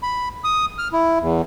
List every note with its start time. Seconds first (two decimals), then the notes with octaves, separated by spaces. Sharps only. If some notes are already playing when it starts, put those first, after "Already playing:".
0.03 B5
0.44 D#6
0.78 F6
0.93 E4
1.21 E2